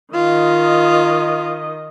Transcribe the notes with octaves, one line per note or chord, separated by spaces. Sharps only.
D#3 F4 D#5